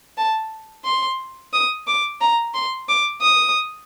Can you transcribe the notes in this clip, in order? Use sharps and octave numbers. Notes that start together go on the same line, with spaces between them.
A5
C6
D#6
D6
A#5
C6
D6
D#6